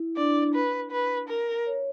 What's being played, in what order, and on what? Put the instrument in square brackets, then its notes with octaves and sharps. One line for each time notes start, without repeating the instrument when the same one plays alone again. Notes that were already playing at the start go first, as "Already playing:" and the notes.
Already playing: [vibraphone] E4
[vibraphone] D4 [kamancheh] D5
[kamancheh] B4
B4
A#4
[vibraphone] C#5